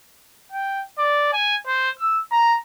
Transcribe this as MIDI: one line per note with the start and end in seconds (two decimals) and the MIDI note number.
0.52 0.83 79
0.99 1.31 74
1.33 1.56 80
1.67 1.90 72
1.99 2.21 88
2.31 2.56 82